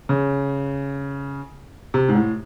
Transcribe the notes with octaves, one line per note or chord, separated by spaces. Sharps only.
C#3
C3
G#2
A2